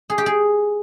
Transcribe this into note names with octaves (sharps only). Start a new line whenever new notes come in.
G#4
G4
G#4